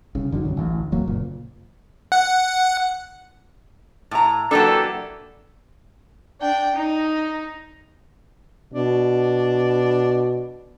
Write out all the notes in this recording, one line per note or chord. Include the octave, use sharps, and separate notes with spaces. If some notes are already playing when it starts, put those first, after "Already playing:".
C2 C#3
F#1 D3 D#3 F#3
C2 G2 C#3 F#3
A1 D2 A2
F1 F#3 A#3
F#1 A#2
F#5
A2 A#5
E3 F#3 A#3 D4 G4 A4
D4 G5
D#4
B2 D4